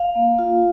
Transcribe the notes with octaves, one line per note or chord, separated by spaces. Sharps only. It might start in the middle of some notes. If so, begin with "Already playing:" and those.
Already playing: F5
A#3
F4